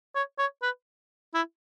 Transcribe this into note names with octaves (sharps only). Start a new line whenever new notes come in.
C#5
C#5
B4
E4